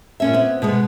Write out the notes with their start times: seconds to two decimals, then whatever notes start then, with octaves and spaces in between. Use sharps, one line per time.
0.20 A#2 C#4 E5
0.33 B3 C4
0.62 B2 G#3 B3